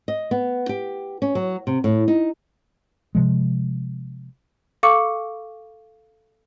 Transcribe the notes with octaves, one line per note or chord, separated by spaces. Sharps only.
D#5
B3
G4
C#4
F#3
C3
A2
D#4
C3 F3 G#3
A4 F5 C#6 D6 E6 C#7